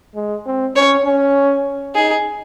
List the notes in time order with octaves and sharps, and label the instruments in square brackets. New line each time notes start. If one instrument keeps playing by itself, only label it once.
[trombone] G#3
C4
[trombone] C#4 [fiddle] C#5
[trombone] C#4
[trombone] D#4 [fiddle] G#4